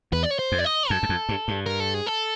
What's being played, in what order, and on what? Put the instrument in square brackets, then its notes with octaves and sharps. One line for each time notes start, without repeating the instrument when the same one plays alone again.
[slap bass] E2 [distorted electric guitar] B4
[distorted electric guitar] D5
C#5
C5
[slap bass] F2
[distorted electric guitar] D5
D#5
[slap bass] F#2 [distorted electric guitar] A4
[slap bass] F#2
F2
G2
G2
[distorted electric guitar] A#4
A4
G#4
A4